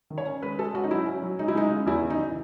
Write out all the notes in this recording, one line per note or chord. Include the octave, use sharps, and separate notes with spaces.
D#3
C#5
C#4
G#3 B4
G#3 A4
C#4 F#4
D#4
F#3 E4
C#4
F#3
G#3 D#4
E4
G#3 D#4
C#3
E2 E4
C#3
D#4
E3